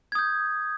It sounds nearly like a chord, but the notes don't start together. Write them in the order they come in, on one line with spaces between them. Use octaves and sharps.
G#6 D#6 G6